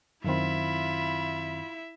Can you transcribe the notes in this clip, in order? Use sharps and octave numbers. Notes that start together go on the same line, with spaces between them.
F#2 D#3 C4 E4 F4 E5 B5